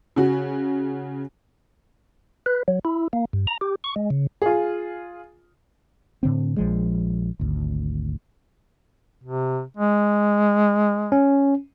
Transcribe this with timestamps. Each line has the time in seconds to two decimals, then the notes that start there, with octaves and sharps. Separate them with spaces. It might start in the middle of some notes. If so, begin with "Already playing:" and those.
0.16 C#3 F#4
2.46 B4
2.68 F#3
2.85 E4
3.13 A#3
3.33 G2
3.47 A#5
3.61 G4
3.84 C#6
3.96 G#3
4.10 C#3
4.42 F4 G#4
6.23 A2 D3 C4
6.57 A#1 F3 G#3
7.40 G#1 D2
9.24 C3
9.77 G#3
11.12 C#4